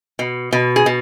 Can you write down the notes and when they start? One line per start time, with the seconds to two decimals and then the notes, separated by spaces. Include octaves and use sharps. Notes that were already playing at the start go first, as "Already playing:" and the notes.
0.19 B2
0.53 B2
0.76 G#4
0.86 B2